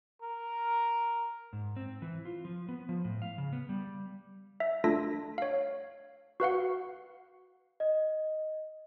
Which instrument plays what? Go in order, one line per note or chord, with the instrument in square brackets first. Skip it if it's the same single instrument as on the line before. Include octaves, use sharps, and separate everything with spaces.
[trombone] A#4
[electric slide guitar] G#2
C4
E3
F4
F3
B3
F3
A2
F5
C#3
B3
G3
[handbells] E5
A3 D4 F4 A4 A#6 B6
C#5 F5
F#4 B4 F5 F#5
[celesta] D#5